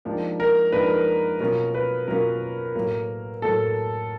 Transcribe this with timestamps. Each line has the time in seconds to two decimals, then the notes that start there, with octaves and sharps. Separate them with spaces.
0.05 G#2 F3 A#3 D4 G4
0.40 A#4
0.72 G#2 F3 A#3 D4 G4 B4
1.40 B2 F#3 A#3 C#4 F4 A#4
1.74 B4
2.08 B2 F#3 A#3 C#4 F4 A#4
2.75 A2 F#3 A#3
3.42 A2 F#3 A#3 A4